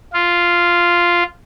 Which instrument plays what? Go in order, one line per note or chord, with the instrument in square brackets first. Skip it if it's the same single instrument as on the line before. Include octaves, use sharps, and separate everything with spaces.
[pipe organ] F4